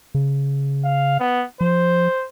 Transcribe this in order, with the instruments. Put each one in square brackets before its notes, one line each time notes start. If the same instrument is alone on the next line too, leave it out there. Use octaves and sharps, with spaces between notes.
[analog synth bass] C#3
[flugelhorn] F5
B3
[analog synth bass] F3 [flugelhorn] C5